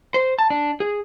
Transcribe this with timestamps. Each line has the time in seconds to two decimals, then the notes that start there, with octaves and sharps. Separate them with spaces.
0.14 C5
0.39 A5
0.50 D4
0.80 G#4